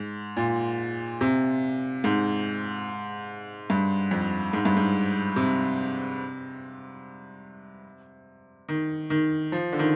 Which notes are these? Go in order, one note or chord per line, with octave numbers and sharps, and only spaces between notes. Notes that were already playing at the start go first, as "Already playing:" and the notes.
Already playing: G#2
A#2
C3
G#2
G2
F2
G#2
G2
G#2
C3
D#3
D#3
F3
D3
D#3